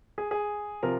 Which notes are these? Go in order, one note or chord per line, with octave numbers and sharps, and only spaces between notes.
G#4
G#4
C3 F3 A#4